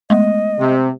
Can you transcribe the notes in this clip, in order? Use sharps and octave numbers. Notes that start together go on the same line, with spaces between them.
G#3 A3 B3 D#5
C3